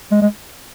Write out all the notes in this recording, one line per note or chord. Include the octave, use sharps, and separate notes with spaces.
G#3
G#3